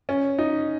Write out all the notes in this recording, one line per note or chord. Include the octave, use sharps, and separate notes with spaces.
C#4
D#4